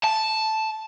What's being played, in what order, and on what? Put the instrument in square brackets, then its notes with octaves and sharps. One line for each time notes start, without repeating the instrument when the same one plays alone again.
[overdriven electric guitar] A5